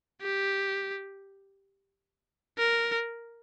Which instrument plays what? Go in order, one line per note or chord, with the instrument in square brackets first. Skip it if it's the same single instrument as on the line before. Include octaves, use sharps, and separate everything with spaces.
[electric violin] G4
A#4